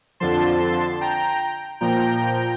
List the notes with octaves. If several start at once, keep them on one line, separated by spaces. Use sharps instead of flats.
F2 D3 F3 A5 C6
G5 A#5
A#2 F3 G5 A#5